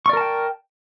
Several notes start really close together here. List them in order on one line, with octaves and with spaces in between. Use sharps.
C#6 D5 A#4 A5 G5